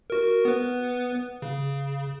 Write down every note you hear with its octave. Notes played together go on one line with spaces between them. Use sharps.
F#4 A#4
B3 B4
C#3